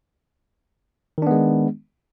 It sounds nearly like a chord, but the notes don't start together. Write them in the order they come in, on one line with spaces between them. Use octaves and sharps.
D#3 D4 B3 G#3